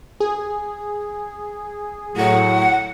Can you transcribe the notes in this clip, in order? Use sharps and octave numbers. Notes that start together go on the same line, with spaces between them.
G#4
A2 F#3 F#5